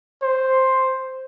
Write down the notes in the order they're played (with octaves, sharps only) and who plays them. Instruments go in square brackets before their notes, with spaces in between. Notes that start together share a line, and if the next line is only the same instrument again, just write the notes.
[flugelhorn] C5